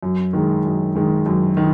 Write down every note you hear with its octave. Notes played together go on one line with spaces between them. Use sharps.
F#2
D#3 G#3
F#2
D#3 G#3
F#2
D#3